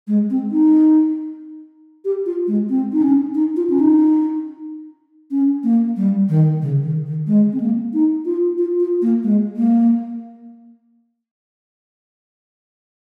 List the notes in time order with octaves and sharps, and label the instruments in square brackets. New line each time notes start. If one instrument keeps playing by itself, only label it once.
[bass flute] G#3
C4
D#4
G4
F4
G#3
C4
D#4
C#4
D#4
F4
C#4
D#4
C#4
A#3
G3
D#3
C#3
D#3
D#3
G#3
C4
A#3
D#4
F4
F4
F4
A#3
G#3
A#3